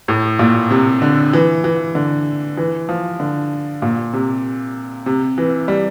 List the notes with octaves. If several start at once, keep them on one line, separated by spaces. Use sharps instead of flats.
A2
A#2
C3
D3
E3
E3
D3
E3
F3
D3
A#2
C3
C3
E3
G3